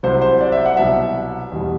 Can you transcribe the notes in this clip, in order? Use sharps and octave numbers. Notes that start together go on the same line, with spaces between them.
C2 C3 F#3 C5
C5
D5
E5
F#5
C2 B2 F#3 E5
E2 B2 G3